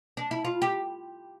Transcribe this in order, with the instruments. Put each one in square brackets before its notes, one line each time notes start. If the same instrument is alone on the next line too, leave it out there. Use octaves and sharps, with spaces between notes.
[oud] D4
E4
F4
G4